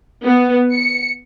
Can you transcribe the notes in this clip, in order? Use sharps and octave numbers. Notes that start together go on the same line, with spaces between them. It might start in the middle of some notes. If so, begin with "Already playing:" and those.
B3
C#7